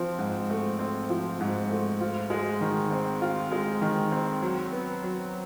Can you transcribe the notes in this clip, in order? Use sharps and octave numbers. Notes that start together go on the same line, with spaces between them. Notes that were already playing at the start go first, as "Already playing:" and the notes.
Already playing: F3 C4
G#2
A3
C4
F3
G#2
A3
F4
G#3
D#3
C4
F4
G#3
D#3
C4
F#3
B3
F#3